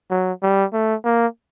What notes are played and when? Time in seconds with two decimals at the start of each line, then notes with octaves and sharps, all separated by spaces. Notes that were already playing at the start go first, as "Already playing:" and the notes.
0.10 F#3
0.43 G3
0.73 A3
1.05 A#3